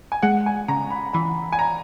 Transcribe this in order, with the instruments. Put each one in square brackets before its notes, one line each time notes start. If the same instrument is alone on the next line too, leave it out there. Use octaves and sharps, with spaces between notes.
[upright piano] G#5
[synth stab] G#3 [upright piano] F#5
[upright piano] G#5
[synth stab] C#3 [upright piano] A#5
[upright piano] B5
[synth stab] E3 [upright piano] B5
[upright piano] G#5
A#5